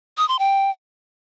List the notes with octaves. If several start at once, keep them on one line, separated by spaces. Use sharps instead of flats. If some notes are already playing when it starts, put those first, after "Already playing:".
D#6
C6
G5